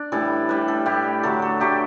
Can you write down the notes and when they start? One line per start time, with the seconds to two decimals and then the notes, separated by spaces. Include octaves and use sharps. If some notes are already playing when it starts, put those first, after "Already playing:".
Already playing: D4
0.12 A2 E3 G3 A4
0.49 A2 G3 B4
0.68 A4
0.86 A2 G3 G4
1.23 D3 F#3 A3 A4
1.42 A4
1.60 D3 F#3 A3 G4